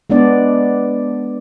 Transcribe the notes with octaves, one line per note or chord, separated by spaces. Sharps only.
G#3 B3 D4 D5